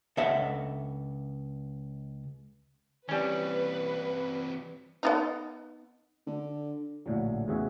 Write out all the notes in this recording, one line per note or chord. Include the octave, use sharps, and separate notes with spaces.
C#2 D4 A4 D#5 E5 F#5
E3 G3 C4 C#4 B4
B3 D4 D#4
D3
A#1 A2 D3 F#3
E2 A2 C#3 F#4 G#4 E5